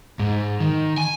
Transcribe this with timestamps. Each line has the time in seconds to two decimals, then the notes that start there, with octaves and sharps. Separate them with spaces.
0.19 G#2
0.60 D#3
0.98 G#5